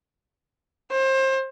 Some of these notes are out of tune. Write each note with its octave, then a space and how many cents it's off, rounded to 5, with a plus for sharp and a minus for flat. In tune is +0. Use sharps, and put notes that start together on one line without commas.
C5 +25